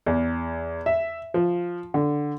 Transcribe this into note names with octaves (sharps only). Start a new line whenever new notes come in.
E2
E5
F3
D3